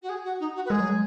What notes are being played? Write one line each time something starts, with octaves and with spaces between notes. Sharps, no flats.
F#4
G#4
F#4
D#4
F#4
B4
G#3 G#4
F#3
G#3